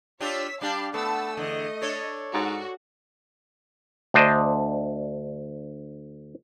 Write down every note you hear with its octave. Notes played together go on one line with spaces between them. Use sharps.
D4 F4 G4 C#5 E6 B6
G3 D4 G4 F5 A5 C7
A3 B3 A5 E6
E2 D3 D#5
D4 A4 C#5
G#2 F#4
D2 D4 C5 D#5